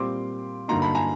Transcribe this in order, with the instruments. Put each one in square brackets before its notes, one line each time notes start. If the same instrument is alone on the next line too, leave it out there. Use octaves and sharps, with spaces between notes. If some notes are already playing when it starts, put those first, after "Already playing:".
Already playing: [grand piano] A#2 G3 C4 C6 D6
G2 D3 F#3 A#3 D#4 A#5 C6
A5 B5
G#5 A#5